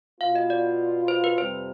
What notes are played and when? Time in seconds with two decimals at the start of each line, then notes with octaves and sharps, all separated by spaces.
0.20 B2 B3 F4 F5
0.35 D#5
0.50 D5
1.08 C5
1.24 B4
1.38 F2 C3 G3 C5